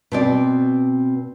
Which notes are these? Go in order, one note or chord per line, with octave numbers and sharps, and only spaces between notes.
B2 C4 D5